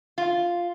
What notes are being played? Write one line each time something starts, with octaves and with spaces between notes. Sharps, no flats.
F4